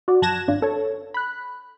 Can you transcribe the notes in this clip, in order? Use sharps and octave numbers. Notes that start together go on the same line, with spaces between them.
F#4 D5
F#2 A5 F#6 G#6 A#6 E7
G#1 D4 F4
A4 C#5
B5 F#6